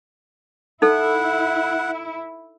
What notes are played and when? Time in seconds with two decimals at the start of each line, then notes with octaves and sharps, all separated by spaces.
0.82 D#4 E4 A4 F#5